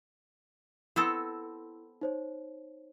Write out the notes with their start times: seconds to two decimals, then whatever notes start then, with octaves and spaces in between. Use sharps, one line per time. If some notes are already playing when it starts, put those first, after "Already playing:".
0.96 B3 C4 E4 A4
2.01 D#4 C5 C#5